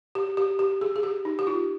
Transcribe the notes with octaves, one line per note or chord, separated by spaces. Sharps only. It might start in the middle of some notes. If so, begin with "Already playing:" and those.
G4
G4
G4
G#4
G#4
G4
D#4
G4
F4